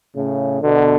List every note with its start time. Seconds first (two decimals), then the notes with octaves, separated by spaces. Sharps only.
0.16 A2 C#3
0.63 B2 D3